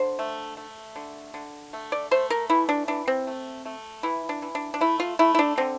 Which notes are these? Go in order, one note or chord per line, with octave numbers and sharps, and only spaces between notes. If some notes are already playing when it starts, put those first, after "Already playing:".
Already playing: D3 C5
A3
A3
D3
D3
A3
D5
A3 C5
A#4
E3 E4
D4
E3 D4
C4
A3
A3
E3 E4
D4
E3
D4
D4
A3 E4
F4
A3 E4
E4
D4
D3 C4